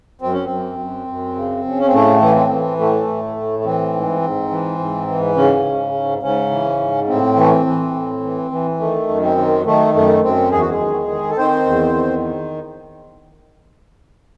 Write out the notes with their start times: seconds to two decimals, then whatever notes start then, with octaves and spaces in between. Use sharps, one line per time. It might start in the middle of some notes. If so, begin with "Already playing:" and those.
0.21 F#2 C4
0.33 C#4
0.45 F#2 C4
0.79 F#2
1.07 F#2
1.36 C#3
1.65 C#3
1.80 C#4
1.86 C4
1.93 A2 A3
2.21 E3
2.36 C4
2.51 E3
2.79 A2 A3
3.08 A2
3.36 A2
3.59 A3
3.65 E3 C4
3.93 G#2
4.21 G#2
4.50 E3
4.79 G#2
5.07 E3
5.36 G#2 C#3 C#4
5.65 G#2
5.94 G#2
6.22 G#2 C#3 C#4
6.51 E3
6.79 G#2
7.08 A2 C4
7.36 E3 A3
7.51 C4
7.66 E3
7.94 A2
8.23 E3
8.51 E3
8.80 D#3 A3
9.08 F#2
9.23 C4
9.37 D#3
9.66 D#3 A3
9.94 F#2 A3
10.23 F#2 C4
10.52 E2 G#4
10.61 F#4
10.70 G#3 G#4
10.80 D#3
11.08 D#3
11.30 A4
11.37 D#3 C4 C5
11.66 E2
11.95 D#3